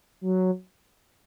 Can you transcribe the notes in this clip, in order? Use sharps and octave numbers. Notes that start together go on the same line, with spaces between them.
F#3